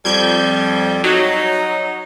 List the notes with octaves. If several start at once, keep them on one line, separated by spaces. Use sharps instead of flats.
F2 G3 G6 G#6
F#3 D#4